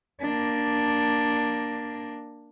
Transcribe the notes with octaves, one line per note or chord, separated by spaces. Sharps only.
A#3 D4